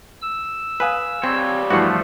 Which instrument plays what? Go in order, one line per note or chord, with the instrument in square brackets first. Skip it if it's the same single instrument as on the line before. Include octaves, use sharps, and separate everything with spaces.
[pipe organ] E6
[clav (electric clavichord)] B4 [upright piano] F5 G#5 D#6
[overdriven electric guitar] G3 C#5 [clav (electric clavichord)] C4
[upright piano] G2 E3 C7 [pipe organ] F3 A3 [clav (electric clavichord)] F#4 F#5